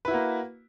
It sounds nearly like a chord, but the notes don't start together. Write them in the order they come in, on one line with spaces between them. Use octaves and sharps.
B4 E4 F#4 A#3